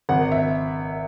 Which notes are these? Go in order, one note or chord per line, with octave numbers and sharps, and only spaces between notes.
G#1 F#5
E5